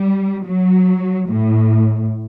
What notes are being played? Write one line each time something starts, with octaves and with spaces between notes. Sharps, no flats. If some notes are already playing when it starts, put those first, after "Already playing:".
Already playing: G3
F#3
A2